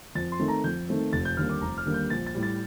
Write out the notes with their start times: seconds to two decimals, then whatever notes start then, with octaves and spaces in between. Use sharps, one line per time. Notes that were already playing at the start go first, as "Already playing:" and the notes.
0.15 F2 A6
0.32 C6
0.40 D#3 A3 C4
0.48 A#5
0.64 F2 G6
0.88 D#3 A3 C4
1.13 F1 A6
1.25 G6
1.37 D#2 D3 G3 A#3 F6
1.49 D6
1.61 F1 A#5
1.78 F6
1.86 D#2 D3 G3 A#3
1.94 G6
2.10 A#1 A6
2.26 A6
2.35 A2 G3
2.43 A6